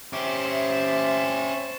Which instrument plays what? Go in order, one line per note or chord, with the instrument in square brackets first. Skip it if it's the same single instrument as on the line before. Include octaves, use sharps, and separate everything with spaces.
[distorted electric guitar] C#4 G4 [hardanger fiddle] C5 A5 [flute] E5